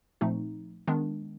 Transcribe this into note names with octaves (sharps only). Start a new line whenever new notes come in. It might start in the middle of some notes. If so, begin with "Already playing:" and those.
A#2 F3 A3 C4 D#4
D#3 G#3 B3 D4